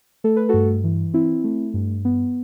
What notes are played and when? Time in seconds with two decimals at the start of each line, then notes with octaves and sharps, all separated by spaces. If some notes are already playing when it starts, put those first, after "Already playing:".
0.24 A3 A4
0.36 B4
0.49 G2 F#4 A4
0.84 E3
1.14 C4 E4
1.44 A3
1.74 G2
2.05 B3